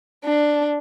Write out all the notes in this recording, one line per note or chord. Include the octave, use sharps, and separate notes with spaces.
D4